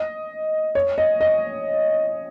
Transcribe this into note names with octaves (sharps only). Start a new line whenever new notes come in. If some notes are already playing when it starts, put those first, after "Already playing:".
Already playing: D#5
C#5
D#5
D#5